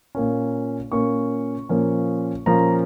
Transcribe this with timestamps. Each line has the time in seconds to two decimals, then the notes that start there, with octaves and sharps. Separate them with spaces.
0.15 A#2 A#3 C#4
0.92 A#2 A#3 C#4 C#6
1.69 A#2 F3 A#3 C#4
2.46 A#2 F3 A#3 C#4 A#5